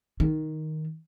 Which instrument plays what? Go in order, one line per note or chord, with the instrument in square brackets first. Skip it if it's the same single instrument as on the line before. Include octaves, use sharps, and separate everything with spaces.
[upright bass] D#3